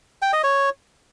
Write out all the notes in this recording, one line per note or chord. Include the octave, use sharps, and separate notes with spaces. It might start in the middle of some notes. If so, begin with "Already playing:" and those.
G5
D#5
C#5